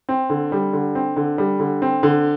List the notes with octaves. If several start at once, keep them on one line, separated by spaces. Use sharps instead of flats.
C4
D3
G3
D3
C4
D3
G3
D3
C4
D3